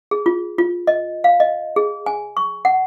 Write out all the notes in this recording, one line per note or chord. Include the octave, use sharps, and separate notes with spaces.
G#4
F4
F4
D#5
F5
D#5
G#4
G#5
C#6
F#5